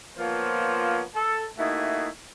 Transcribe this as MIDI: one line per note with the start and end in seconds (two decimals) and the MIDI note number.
0.17 1.01 53
0.17 1.01 58
0.17 1.01 59
0.17 1.01 65
0.17 1.01 72
0.17 1.01 73
1.15 1.43 69
1.58 2.07 57
1.58 2.07 58
1.58 2.07 63
1.58 2.07 64
1.58 2.07 66
1.58 2.07 68